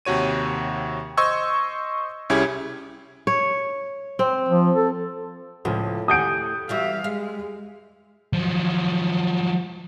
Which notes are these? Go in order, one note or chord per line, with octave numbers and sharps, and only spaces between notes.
D#2 C3 F#4 C#5 D#7
C5 D#5 C6 C#6 E6 G#6
C2 C#4 E4 G4 G#4 G#6
C#5
C4
F3
A4
C#2 A2 F3
G4 F#5 G#5 D#6 G6 D7
E3 G3 F#4 E5 F5
G#3 F5
F3 F#3